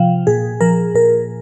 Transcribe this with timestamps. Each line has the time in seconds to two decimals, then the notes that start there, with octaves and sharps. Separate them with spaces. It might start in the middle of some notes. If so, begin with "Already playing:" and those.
Already playing: C3 F3 F5 G5
0.27 A#2 G#4
0.61 F3 A#4
0.95 A#2 A#4